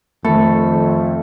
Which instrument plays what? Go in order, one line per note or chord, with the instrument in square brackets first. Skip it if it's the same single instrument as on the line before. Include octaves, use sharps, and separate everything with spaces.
[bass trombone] F2 [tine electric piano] D#3 B5 [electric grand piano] A3 [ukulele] A4